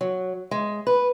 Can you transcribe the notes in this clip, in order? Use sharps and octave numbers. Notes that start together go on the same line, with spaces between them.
F#3
G#3
B4